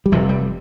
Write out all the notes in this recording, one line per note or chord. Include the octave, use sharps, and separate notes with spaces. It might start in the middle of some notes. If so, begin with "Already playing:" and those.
G3
F1 F2 C3 F3
G3